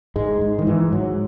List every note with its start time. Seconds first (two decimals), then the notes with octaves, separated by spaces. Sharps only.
0.16 G#2 G#3
0.41 G#2
0.59 D#3
0.67 G#2 E3
0.92 G#2 F#3